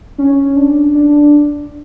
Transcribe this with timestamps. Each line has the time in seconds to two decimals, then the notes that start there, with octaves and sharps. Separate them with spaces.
0.18 C#4
0.56 D4
0.95 D4